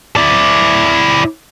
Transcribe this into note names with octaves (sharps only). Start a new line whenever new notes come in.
E4 D5